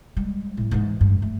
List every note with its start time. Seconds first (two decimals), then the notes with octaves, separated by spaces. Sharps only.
0.17 G3 G#3
0.57 A2 F#3
0.71 G#2 E3
1.01 G2
1.22 A3